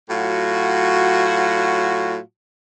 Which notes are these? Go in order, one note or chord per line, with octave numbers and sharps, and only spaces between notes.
A2 F#3 F4 F#4